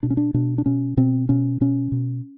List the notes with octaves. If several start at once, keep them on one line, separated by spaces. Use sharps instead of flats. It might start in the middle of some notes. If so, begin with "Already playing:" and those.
B2 D4
C#4
D4
B2 D4
D4
B2 C#4
B2 C4
B2 C#4
B2 C#4
B2